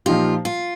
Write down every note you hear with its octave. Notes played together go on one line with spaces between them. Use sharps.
A#2 F3 D#4 F4 G4
F4